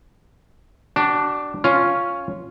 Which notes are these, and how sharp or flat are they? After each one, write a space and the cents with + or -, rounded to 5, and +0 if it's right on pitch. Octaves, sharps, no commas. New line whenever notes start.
D4 +0 F#4 +45
C#4 +0 F4 +0